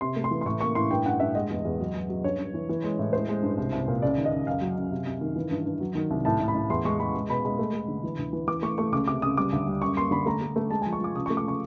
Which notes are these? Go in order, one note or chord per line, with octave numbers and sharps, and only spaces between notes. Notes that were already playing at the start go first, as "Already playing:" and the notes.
C3 C6
A3
C6
E3
C6
A2 C#6
A#3 C#6
A2 C6
G2 G5
G2 F#5
G2 E5
G#3 D#5
E2
E2
F#3
F#3
F#3
G2 C#5
G2
E3
E3
G#3
A2
G#3 C5
G#3
G2
C2
C2
A#2
C#2 D5
D#3
D#5
C#2
F#2 F5
F#3
F#2
C3
C3
D#3
E3
G2
G2
F#3
D#3
C2
A2 A5
A2
B5
A2
E2 C6
G#3 C#6
G#3 B5
G#3
B2 B5
G#3 B5
A3
A3
D3
E3
D2
E3
E3 D6
A3 C#6
A3 C#6
C#2 D6
C3 D6
C#2 D#6
G3 D6
D2
G3
F#2 C#6
A#3 C6
D3 B5
A3 A#5
A3
A3
G#3 A5
G#5
F3
C#6
F3 D6
C#3 D#6
C#6
A3
D6
C#3 C#6